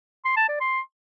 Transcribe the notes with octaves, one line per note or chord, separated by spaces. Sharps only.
C6
A5
D5
C6